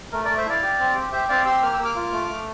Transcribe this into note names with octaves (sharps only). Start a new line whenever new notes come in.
A3 A#4
A#4 D5
A3
C5 E5
E4 D5 F5
G4
C4
G4
G4 C5 E5
C4 D5 F5
G4 C6 E6
A#3 F6
E6
A#3
D6 F6
F4
A3
A3